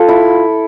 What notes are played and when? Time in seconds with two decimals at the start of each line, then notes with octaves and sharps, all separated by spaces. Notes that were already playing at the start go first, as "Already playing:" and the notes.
Already playing: F4 A4
0.09 E4